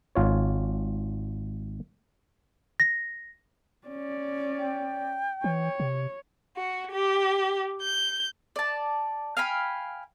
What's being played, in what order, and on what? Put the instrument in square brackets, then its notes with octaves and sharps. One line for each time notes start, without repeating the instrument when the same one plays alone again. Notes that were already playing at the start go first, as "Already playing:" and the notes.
[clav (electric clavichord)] G#1 F4 C#5
[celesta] A#6
[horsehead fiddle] C#4 D5
[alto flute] G5
[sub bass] E3 [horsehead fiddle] C#5
[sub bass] C3
[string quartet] F#4
G4
G6
[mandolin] D5 A5
F5 G5 G#5 B5